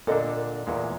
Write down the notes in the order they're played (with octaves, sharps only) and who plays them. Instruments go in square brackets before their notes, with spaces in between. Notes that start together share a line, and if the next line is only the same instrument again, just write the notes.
[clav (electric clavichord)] A#2 D3 D4 [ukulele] A4 D#5
[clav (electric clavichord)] E2 A#2 G#3